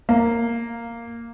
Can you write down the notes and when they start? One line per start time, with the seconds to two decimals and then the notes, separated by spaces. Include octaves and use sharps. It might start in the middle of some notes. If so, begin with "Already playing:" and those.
0.09 A#3